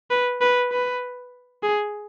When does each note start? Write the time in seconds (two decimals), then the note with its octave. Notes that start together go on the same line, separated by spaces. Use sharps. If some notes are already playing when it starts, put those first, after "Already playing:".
0.11 B4
0.41 B4
0.72 B4
1.63 G#4